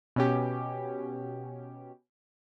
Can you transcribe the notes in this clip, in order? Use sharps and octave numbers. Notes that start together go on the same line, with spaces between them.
B2 C#4 G4